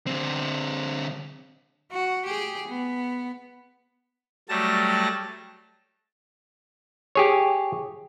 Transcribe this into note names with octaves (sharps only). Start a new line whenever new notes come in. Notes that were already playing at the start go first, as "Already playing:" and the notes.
D3 C4
F#4
G4 G#4
B3
F#3 G3 A3 A5 A#6
G4 G#4 C#5